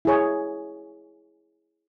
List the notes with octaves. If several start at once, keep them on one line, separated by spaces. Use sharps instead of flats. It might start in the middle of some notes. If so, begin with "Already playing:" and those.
E4 G#4 C#5